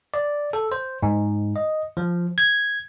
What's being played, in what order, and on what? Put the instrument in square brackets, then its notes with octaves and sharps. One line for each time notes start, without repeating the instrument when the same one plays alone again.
[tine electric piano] D5
A4
C5
G#2
D#5
F3
G#6